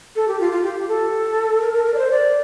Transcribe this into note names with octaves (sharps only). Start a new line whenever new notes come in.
A4
G4
F4
F4
G4
A4
A#4
A#4
A#4
D5
C5
D5